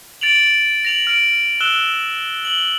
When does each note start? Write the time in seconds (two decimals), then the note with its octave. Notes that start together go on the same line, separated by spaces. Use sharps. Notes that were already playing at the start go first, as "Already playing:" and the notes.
0.21 A6 D7 F7 F#7
0.85 A#6 F7 F#7
1.07 F6 D7
1.61 E6 F#6 E7 G7
2.45 F#7 G7